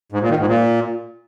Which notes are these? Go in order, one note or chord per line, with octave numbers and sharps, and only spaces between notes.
G#2
A#2
D#3
G#2
A#2